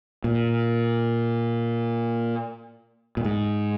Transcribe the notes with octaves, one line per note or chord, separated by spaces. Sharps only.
A#2
A#2
G#2